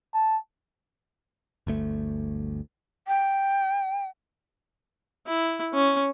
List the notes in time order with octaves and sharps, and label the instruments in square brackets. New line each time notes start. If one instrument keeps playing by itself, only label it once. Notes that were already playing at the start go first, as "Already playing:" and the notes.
[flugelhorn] A5
[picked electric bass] G1 D2 A3
[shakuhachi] G5
[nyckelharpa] E4
C#4